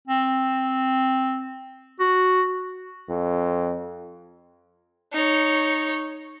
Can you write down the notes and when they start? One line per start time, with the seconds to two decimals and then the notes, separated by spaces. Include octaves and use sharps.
0.08 C4
2.00 F#4
3.09 F2
5.13 D#4 C#5